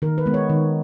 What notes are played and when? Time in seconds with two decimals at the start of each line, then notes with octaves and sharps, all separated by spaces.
0.02 D#3 A#4
0.18 B4
0.26 G#3 B3
0.34 C#5
0.50 D#3